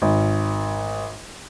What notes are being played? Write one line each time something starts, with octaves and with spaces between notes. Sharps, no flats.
G#1